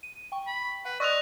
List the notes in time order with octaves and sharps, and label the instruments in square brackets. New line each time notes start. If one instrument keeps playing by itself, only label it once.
[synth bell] D#7
G5 C#6
[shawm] B5
[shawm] B4 [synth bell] F#5
[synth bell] D5 C6 E6 [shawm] D#5 [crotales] C#6 F#6 F7